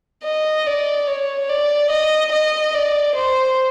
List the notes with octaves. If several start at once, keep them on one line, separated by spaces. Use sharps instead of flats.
D#5
D5
C#5
D5
D#5
D#5
D5
C5